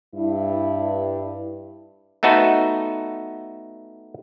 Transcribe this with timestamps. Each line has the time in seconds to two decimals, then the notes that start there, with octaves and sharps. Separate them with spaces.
0.14 G2 E4
2.23 A3 B3 D#4 F#4 A4 B4